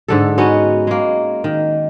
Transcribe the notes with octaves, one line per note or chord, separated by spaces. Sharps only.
G#2 D3 A4
B3 C#4 D#4 F#4
G#3 A#3
D#3